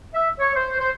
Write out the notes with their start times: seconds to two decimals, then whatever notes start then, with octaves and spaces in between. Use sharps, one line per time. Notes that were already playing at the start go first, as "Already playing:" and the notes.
0.14 E5
0.39 C#5
0.56 C5
0.78 C5